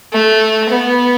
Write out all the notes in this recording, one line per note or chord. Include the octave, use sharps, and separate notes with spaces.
A3
B3